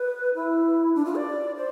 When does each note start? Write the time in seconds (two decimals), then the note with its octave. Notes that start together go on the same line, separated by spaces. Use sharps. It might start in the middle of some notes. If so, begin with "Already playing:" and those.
Already playing: B4
0.35 E4
0.95 D4
1.05 F4
1.15 D5
1.56 C5